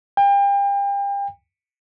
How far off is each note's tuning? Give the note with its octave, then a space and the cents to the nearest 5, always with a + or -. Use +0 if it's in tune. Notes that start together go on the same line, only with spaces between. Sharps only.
G5 +35